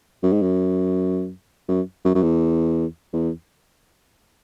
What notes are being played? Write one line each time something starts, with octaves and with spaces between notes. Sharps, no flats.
F#2
G#2
F#2
F#2
F#2
F#2
E2
E2